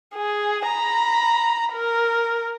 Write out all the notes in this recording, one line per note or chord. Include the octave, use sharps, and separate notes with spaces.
G#4
A#5 B5
A#4